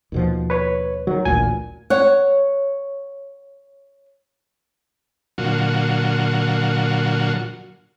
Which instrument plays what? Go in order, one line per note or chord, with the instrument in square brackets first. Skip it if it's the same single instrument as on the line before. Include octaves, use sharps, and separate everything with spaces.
[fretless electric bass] D#2 B2 F3
[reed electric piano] B4 C#5
[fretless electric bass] D#3 [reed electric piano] F#3
[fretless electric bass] A1 D2 A#2 [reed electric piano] G#5
[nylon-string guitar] C#5 F#5
[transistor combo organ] A#2 D3 F#3 F4 F#4